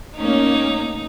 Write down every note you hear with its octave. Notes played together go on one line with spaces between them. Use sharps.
A3 A#3 C#4 D#4